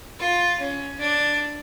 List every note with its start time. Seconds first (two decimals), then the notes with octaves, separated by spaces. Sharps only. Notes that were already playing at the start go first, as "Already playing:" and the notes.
0.19 F4
0.59 C#4
0.99 D4